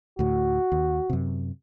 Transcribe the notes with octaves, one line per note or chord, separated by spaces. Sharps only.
D2 A2 F#4
D#2
F#2 C3